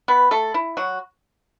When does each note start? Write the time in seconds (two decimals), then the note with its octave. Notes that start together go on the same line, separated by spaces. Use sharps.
0.08 B3 B4
0.31 A3 A4
0.54 E4
0.77 F#3 F#4